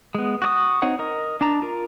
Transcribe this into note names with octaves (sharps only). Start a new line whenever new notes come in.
G#3 B3
F#4 D5 D#6
C4 D#4 C#5 F#5
A#4 D#5
D4 A5 A#5
F4 A#4